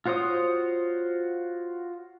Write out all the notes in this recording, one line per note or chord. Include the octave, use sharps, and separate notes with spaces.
F4 F#4 C5 C#5 D#6